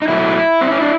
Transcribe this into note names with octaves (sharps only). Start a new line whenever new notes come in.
D#4
B2 F#3 A3 E4
C4
C#4
D4